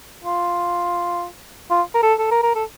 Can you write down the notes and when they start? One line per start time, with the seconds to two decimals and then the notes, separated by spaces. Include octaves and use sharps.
0.24 F4
1.70 F4
1.94 A#4
2.03 A4
2.19 A4
2.31 A#4
2.43 A#4
2.55 A4